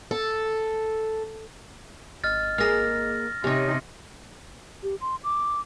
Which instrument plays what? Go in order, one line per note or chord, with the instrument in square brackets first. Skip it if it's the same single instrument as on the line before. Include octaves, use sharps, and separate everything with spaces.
[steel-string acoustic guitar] A4
[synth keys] G#1 D#5 [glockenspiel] F6 A6
[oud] A#3 G#4 [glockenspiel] F6 A#6
[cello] C3 D#4 [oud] C#4 C#5 [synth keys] G4
[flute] G4
C6
D6